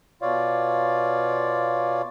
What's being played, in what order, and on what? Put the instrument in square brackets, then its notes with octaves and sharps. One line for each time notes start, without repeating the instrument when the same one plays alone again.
[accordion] B2 F4 C#5 D5 F5